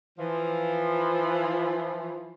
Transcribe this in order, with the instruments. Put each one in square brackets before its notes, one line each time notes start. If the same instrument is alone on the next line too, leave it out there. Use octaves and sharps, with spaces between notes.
[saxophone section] E3 F3